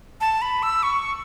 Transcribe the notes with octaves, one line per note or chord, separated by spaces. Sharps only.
A5
B5
E6
C#6